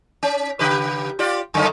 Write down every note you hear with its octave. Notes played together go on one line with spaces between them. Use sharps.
C#4
C#3 G4 B4
F4 G4 D5
F#2 D3 D#3